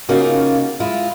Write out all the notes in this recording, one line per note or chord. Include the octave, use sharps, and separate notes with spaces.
C#3 A#3 C#4 D#4 F4 F#4
G#3 E4 F4